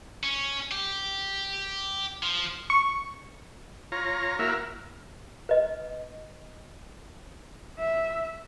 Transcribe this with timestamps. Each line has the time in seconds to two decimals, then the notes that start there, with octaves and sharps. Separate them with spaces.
0.23 C#4
0.72 G4
2.23 F3
2.70 C#6
3.92 F4 C#5 A#5
4.39 A#3 E4 F#4 A#4 E5 F5
5.49 B4 D#5
7.79 E5